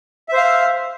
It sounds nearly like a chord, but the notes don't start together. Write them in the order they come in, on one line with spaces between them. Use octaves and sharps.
E5 C5 F5